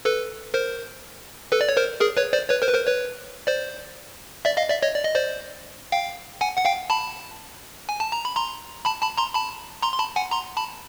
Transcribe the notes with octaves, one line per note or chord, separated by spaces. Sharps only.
A4 B4
A#4 C5
A4 B4
D5
C#5
A#4 C5
G#4 A#4
B4 C#5
C5 D5
B4 C#5
A#4 C5
B4
A#4 C5
B4 C#5
C5 D5
D5 E5
D#5 F5
D5 E5
C#5 D#5
D5
D#5
C5 D5
F5 G5
F#5 G#5
F#5
F5 G5
A5 B5
G#5
A5
A#5
B5
A#5 C6
A5 B5
A5 B5
A#5 C6
A5 B5
A#5 C6
C6
A5 B5
F#5 G#5
A#5 C6
A5 B5